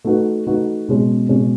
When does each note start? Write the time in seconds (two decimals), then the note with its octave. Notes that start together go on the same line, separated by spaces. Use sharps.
0.05 A3 D#4 F#4 B4
0.47 A3 D#4 F#4 B4
0.88 B2 G#3 C#4
1.29 B2 G#3 C#4